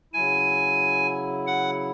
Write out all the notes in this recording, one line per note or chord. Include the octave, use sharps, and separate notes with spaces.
C#3 F#3 E4 G#5
F#5